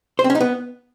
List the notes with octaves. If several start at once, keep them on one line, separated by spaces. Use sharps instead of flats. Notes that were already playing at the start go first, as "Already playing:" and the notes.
C5
C4
C#4
D#4
B3